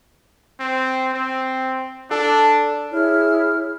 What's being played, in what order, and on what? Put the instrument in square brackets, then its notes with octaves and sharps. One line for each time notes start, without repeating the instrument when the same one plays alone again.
[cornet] C4
C4
[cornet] D4 [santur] A4
[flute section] E4 G#4 C#5 F6